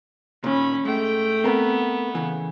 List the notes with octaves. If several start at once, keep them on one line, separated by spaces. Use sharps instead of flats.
A#2 D#3 C#4 B5
G#2 A3 G5
B3 C4 A#4 A#5
C#3 E3